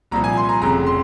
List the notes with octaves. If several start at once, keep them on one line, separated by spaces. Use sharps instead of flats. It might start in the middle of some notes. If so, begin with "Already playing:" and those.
C2 A#2 F3 A#5
G#5
C6
A#5
F1 F2 C#3 A#5
C6